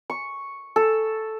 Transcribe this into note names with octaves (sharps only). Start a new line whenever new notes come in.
C#6
A4